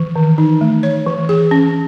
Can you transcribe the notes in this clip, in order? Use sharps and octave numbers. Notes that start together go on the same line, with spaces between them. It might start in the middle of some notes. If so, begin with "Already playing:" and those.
Already playing: E3
D#3
D#4
A3
C#5
E3
G#4
C#4